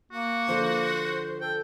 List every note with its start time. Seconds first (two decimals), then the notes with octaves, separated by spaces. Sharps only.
0.12 A#3 F#4
0.48 D3 F3 C5
1.41 A4 G5